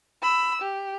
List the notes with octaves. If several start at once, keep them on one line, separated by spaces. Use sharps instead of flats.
B5 E6
G4